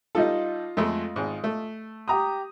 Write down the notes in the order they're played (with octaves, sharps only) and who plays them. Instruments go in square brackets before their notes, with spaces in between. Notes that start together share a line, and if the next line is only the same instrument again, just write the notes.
[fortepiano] G3 D#4 A4 [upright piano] F4 D#5
[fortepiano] F2 G#3 A3
G#1 G#2
A3
[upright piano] G4 A#5 D#6